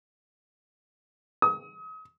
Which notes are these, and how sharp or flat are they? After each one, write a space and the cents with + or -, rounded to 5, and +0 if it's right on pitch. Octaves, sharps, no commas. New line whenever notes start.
D#6 +35